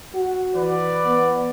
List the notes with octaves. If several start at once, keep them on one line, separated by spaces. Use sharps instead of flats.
F#4
E3 B4 D5
B3